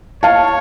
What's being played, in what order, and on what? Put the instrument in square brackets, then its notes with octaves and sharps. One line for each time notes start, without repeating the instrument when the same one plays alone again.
[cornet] C#5 [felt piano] F5 A5